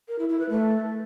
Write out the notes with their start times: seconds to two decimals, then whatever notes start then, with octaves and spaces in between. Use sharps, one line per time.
0.08 A#4
0.19 E4
0.29 E4
0.39 B4
0.50 A3